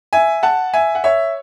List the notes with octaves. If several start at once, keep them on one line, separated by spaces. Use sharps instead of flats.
E5 G#5
F#5 A5
E5 G#5
F#5
C#5 E5